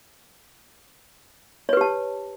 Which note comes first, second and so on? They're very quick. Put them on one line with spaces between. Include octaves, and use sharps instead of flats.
C#5 B4 G4 A5